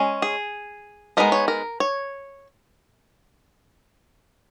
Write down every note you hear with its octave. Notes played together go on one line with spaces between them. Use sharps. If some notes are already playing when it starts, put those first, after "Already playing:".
Already playing: G#3 C#4
G#4
G#3 B3 D#4 A#4
C#5
A#4
C#5